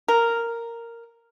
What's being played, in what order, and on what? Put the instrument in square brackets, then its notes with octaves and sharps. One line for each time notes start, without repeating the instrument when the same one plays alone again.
[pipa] A#4